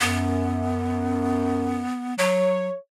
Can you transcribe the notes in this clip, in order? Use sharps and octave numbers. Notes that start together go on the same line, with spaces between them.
F#2 B3
F#3 C#5